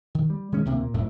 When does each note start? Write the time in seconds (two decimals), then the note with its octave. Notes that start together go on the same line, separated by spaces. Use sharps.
0.15 D#3
0.30 G3
0.52 D#3 G#3 C#4
0.65 D2 C3 D#3 A#3
0.79 A#2
0.94 F1 F#2 A2 A3